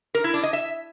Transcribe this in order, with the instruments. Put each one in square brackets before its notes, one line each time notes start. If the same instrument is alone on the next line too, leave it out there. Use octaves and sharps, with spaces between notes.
[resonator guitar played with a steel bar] A#4
E4
D4
D#5
E5